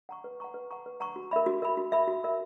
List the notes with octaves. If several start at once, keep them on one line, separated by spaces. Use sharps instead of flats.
F#5 A#5 C#6
B4
F#5 A#5 C#6
B4
F#5 A#5 C#6
B4
F#5 A#5 C#6
F#4
A#4 E5 B5
F#4
A#4 E5 B5
F#4
A#4 E5 B5
F#4
A#4 E5 B5